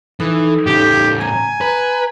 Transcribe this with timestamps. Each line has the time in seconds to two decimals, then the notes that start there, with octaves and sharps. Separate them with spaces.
0.20 E3 D#4 A4
0.66 A2 C#3 G4
1.21 G#5 A#5
1.61 B4